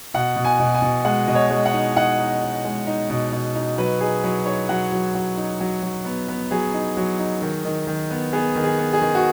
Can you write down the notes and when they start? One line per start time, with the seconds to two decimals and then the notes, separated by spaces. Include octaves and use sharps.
0.14 B2 F#5
0.36 B2
0.45 G#5
0.59 B2
0.75 G#5
0.82 B2
1.05 G#3 F#5
1.28 B2 D#5
1.35 C#5
1.50 G#3
1.65 F#5
1.74 D#4
1.96 D#4 F#5
2.18 D#4
2.42 D#4
2.65 G#3
2.87 D#4
3.10 B2
3.32 B2
3.55 D#4
3.78 F#3 B4
4.01 D#4 G#4
4.23 F#3 B4
4.46 D#4 C#5
4.69 F#3 F#5
4.92 F#3
5.15 F#3
5.37 D#4
5.60 F#3
5.82 F#3
6.05 B3
6.28 B3
6.51 F#3 G#4
6.74 D#4
6.97 F#3
7.19 D#4
7.42 D#3
7.65 D#3
7.87 D#3
8.11 B3
8.33 B3 G#4
8.55 D#3
8.64 G#4
8.78 B3
8.93 G#4
9.02 D#3
9.15 F#4